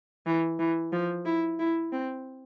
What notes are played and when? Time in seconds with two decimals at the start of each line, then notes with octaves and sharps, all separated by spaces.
0.26 E3
0.59 E3
0.93 F3
1.25 E4
1.59 E4
1.92 C4